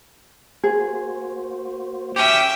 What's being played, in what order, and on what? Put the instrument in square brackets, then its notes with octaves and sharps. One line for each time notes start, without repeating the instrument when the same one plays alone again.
[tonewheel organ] A#3 F#4 C5 [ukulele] G#4
[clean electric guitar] C#4 G4 [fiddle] E5 G5